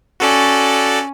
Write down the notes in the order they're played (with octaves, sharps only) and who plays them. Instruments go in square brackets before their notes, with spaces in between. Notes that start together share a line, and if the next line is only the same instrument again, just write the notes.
[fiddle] C#4 [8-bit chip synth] F#4 A4 D5